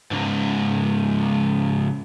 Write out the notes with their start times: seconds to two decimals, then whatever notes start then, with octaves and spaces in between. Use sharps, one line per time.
0.11 C#2 G#2